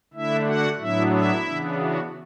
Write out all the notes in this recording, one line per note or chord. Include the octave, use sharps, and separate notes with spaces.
D3 A3 D4 E4 E5
F#4 F#5
A2 F#3 B3 D4 E4 E5
E4 E5
C#3 E3 B3 D4
F#4